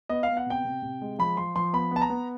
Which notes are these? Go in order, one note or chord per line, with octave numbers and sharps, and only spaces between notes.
B3 D#5
F5
B3
F#5
C3 G5
C3
C3
G#3
F3 B5
F3 C6
F3 C6
B3 B5
B3 A5
A#5
B3